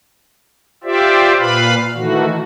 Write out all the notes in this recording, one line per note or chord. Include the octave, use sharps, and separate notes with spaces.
F4 G4 C5 D5 E5
A#2 B4 F5 B5
D#3 E3 A3 F#4